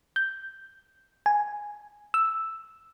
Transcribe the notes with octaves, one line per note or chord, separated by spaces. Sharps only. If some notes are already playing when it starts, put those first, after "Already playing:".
G6
G#5
E6